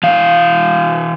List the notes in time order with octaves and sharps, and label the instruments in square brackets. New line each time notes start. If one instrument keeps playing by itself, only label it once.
[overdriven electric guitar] E3 F5